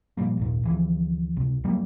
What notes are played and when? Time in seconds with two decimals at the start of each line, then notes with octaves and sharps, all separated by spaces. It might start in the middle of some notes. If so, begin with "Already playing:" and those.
0.17 A#2 F3 G3 A#3
0.37 G#1 D#2 A#2
0.64 D2 E3 F3
1.37 C#2 C3
1.64 F2 F#3 G3 A#3